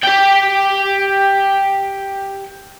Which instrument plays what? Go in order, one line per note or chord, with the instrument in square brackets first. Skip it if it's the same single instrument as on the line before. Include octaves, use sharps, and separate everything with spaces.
[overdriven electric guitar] G4 G5